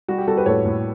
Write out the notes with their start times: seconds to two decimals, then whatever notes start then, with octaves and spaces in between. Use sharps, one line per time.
0.08 G3 F#4
0.18 G4
0.27 G3 F#4 A4
0.37 G4 B4
0.46 A2 A4 C#5
0.65 A2